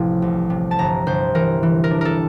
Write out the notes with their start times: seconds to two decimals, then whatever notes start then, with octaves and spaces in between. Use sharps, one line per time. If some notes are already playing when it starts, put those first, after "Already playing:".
Already playing: A1 C3 F3 C6
0.22 C2
0.50 C3
0.71 A5
0.79 G1 A#5
1.07 G1 C5
1.35 E3 A#4
1.63 E3
1.84 A#4
1.91 D4
2.01 A4 A#4